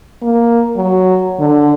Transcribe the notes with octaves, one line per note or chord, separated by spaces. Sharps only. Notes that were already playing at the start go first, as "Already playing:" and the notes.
A#3
F#3
D3